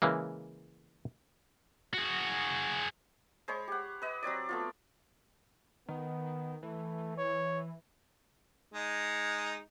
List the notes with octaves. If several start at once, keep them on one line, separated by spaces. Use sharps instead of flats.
C#3 E3 G#3 A#3
F#4 G#4
G#3 C5 C#5 B5
G4 F#5
B4 D#5
F#3 C4 C#5 D5
A3 B3 F4
D#3 B3
E3 A3
C#5
G#3 D#4